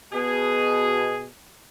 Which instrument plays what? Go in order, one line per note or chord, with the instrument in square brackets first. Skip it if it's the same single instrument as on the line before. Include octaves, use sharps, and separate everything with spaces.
[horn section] B2 G#4